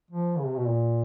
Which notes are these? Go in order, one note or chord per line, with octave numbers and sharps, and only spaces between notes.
F3
C#3
C3
B2
A#2